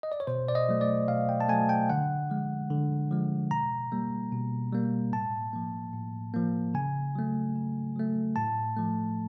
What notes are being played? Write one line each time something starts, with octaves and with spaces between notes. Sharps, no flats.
D#5
D5
C#5
B2 C5
D5
D#5
F#3 A3
D5
B2 F5
G5
A5
F#3 A3 G#5
G5
D3 F#5
F3 G#3
D3
F3 G#3
B2 A#5
G3 A#3
B2
G3 A#3
A2 A5
F3 A#3
A2
F3 A#3
C#3 G#5
F#3 A3
C#3
F#3 A3
A2 A5
F3 A3